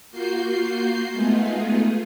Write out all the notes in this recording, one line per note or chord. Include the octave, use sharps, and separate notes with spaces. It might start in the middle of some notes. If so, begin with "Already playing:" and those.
A#3 F4 F#4 G6 C7
G#3 A3 B3 D#4 F4 G#4